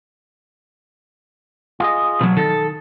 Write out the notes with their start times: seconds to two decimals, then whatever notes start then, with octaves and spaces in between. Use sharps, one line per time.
1.80 F4 G#4 D#5
2.21 B2 F#3
2.37 D#3 A4